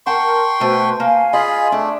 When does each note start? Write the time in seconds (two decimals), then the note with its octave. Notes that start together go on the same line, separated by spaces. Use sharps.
0.06 A#4 F#5 G5 A5 C6 C#6
0.60 B2 A3 F#4 B4 C5
1.00 A#3 F5 G#5
1.33 F4 G#4 D#5 B5
1.72 A3 D4